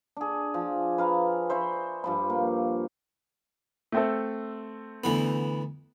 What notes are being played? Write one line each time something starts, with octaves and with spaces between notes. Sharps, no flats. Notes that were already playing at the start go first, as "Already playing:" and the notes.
D4 G#4
F3
B4 F5 A#5
C5 E5 B5 C#6
G2 F3 B5
A#3
A3 C4 A4
D2 E3 B3